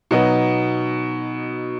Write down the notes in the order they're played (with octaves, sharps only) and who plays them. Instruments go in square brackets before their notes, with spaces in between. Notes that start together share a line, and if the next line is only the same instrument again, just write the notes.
[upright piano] B2 F#3 B3 D#4